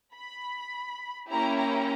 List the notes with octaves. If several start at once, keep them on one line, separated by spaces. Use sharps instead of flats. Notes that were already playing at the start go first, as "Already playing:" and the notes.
B5
A#3 C#4 E4 G4 A#5
A#5